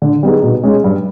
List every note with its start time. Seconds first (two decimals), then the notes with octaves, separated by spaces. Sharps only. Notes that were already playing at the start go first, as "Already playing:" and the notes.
0.02 D3
0.23 G3 B3 D#4 G#4
0.43 B2
0.64 G#3 C#4
0.84 G2